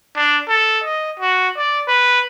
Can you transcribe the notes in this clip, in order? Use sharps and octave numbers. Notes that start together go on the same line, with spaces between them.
D4
A4
D#5
F#4
D5
B4